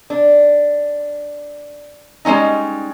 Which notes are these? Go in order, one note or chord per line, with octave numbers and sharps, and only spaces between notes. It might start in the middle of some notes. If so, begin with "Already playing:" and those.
D4
G3 G#3 A#3 C#4 D#4